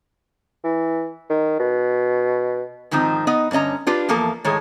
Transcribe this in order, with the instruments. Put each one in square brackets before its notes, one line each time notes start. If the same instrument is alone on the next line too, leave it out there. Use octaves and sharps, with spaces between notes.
[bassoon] E3
D#3
B2
[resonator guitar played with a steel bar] G#2 D#3 F3 C4 D#4
B3 D#4 D#5
G2 D3 C#4 D#5 A#5
D4 F4 G4 B4
E2 F3 A#3 A4
A2 D#3 G#3 A4 C#5